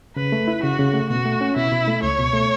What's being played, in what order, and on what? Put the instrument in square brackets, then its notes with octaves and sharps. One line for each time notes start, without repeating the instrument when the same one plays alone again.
[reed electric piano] C#3 [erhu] B4
[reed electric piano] A3
E4
[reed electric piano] C#3 [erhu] F#4
[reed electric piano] C#3
A3
[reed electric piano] B2 [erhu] F#4
[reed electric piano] A3
C#4
[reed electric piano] B2 [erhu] E4
[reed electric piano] B2
A3
[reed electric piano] C#2 [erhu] C#5
[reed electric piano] B2
A3